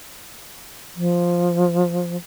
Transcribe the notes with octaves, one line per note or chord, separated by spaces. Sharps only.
F3